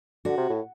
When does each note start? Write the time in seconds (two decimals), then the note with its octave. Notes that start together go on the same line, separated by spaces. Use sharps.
0.25 D3 F#4
0.38 C3
0.50 A2